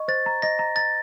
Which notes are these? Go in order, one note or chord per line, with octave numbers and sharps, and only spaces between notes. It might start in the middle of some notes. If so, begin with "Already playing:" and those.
Already playing: D#5 C#6
C5 A6
A#5
D#5 A#6
A#5
A#5 A6